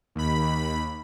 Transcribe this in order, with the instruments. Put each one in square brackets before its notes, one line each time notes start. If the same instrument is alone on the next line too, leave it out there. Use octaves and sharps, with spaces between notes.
[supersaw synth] D#2 B5